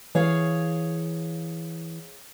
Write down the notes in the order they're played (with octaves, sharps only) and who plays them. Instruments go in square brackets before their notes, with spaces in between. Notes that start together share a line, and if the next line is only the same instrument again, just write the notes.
[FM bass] E3 [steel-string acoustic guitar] G#4 C#5 F5